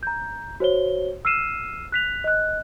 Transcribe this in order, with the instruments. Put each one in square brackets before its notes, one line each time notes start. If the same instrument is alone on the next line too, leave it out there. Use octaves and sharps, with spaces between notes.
[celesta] A#5 G6
F#4 C5 C#5 G7
E6 F6 C7 D#7 E7
F#6 B6 F7
D#5 F#6